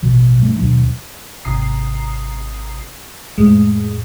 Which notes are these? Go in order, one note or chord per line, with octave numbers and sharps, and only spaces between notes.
A1 B2 F3
G2 F3 A3
D#2 B2 F#3 D4
G#1 C3 A#5 D#6 C7
F2 A2 G#3